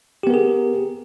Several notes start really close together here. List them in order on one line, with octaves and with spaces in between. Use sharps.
G4 B3 A#4 G#4